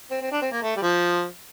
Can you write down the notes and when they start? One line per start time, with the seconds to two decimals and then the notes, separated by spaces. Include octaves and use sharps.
0.11 C4
0.21 C4
0.32 D4
0.42 C4
0.52 A#3
0.62 A3
0.76 G3
0.82 F3